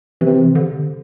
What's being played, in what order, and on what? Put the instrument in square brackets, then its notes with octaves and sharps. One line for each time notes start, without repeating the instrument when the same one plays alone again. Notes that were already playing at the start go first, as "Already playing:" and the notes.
[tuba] C3 [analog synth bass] E3
[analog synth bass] D3